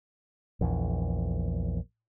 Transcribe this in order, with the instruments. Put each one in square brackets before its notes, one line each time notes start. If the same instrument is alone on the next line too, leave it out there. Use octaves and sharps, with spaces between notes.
[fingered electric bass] A#1 E2